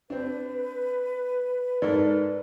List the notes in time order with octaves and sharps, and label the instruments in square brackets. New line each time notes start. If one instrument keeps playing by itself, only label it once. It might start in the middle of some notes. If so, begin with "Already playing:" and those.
[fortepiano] C4 D4 [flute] B4
[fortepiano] G#2 A4 A#4 [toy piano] D5